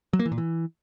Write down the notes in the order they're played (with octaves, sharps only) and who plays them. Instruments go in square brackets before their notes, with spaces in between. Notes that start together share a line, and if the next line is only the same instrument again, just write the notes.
[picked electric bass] F#3
A#3
E3
A#2
E3